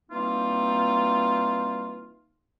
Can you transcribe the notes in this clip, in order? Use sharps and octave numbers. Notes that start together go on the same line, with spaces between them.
E3 G3 A#3 C4 D#4 F4